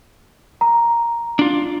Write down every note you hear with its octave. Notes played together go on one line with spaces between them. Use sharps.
A#5
D4 F4